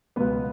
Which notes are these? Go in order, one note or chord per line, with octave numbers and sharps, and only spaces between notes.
C#2 B2 F#3 B3 B4